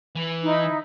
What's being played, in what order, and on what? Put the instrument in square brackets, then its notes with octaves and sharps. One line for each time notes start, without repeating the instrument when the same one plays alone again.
[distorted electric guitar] E3
[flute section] D#4 E4